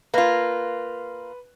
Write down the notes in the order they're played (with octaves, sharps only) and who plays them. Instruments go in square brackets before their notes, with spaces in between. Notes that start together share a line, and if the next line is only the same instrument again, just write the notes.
[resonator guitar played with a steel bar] A#3 F4 [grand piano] B4